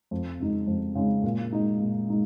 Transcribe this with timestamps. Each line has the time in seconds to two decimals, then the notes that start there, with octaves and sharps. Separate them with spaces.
0.11 F2
0.39 C#3 G#3 D#4
0.67 F2
0.95 C#3 G#3 D#4
1.24 A#2
1.52 G#3 D#4
1.81 A#2
2.09 G#3 D#4